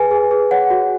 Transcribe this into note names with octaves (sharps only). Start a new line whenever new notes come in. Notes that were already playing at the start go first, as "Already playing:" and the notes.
Already playing: G#4 B4 G#5
G#4
G#4
C#5 F#5
F#4